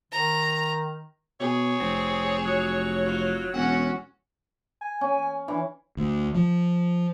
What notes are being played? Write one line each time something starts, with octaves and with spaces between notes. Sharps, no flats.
D#3 A#5
B2 G#4 C#5
F1 C4
F#3
F4
E1 C#4 F#4 F#5
G#5
C#4
E3 D4
D2
F3